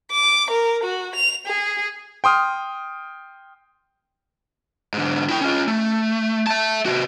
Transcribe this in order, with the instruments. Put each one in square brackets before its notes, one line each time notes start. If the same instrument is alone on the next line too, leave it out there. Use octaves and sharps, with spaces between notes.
[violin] D6
A#4
F#4
F7
G#4
[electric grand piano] G5 C6 D#6 F6
[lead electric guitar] G#2 D3
E4 G5
C#4 F4
A3
E5 A5
C3 F#4